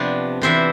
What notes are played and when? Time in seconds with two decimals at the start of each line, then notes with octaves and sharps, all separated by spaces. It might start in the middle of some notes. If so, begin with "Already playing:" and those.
Already playing: C3 F3 B3 D4
0.42 C3 E3 B3 D4 C5 E5